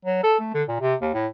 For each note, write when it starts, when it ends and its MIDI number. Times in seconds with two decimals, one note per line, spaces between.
0.05 0.19 54
0.23 0.35 69
0.39 0.51 57
0.54 0.63 50
0.68 0.77 46
0.80 0.94 48
1.01 1.09 39
1.14 1.27 45